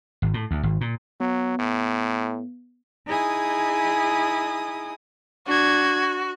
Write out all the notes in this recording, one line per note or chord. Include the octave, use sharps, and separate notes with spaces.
G#1
A2
D2
G#1
A#2
F#3 B3
A2
D#4 E4 G#4 G#5 D#6
D4 F#4 G#6